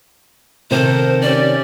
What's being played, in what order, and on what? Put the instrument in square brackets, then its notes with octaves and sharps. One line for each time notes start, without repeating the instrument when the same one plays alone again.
[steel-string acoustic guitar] C3 D#3 [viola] A4 A#4 [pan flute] C5
[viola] C#4 G4 [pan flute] D5